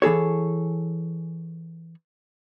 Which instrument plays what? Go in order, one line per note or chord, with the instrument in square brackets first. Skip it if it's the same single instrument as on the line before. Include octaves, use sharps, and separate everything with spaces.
[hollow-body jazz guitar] E3 G#4 A4 C#5